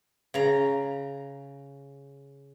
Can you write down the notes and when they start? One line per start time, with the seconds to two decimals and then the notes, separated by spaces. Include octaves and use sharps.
0.34 C#3 A#5